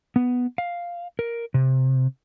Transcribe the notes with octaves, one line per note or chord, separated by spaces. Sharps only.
B3
F5
A#4
C3